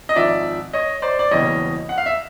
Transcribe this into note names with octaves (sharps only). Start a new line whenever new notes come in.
D#5
G#1 G#2 F3 D5 E5
C#5 D#5
C5 D5
D5
F#1 E2 B2 G3 C#5 D#5
F#5
F5
E5